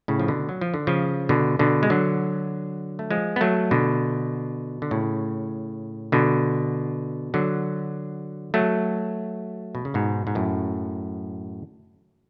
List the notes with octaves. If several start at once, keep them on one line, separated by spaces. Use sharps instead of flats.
A2 C#3
F3
B2 D3
F#3
F3
D3
C#3 F3
B2 D3
B2 D3
G#3
D3 F#3
A3
F3 G#3
B3
F#3 A3
B2 D3
D3
A2 C#3
B2 D3
D3 F#3
F#3 A3
B2
C#3
G#2 B2
G#2
F#2 A2